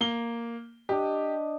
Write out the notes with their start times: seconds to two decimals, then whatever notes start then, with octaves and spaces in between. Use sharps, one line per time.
0.01 A#3 G7
0.89 D4 G4 D#5